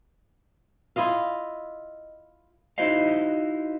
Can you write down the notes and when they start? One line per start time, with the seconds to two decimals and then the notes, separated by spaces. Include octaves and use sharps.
0.96 E4 F4 D#5 F5
2.78 D#4 E4 F#4 C5 D#5 F5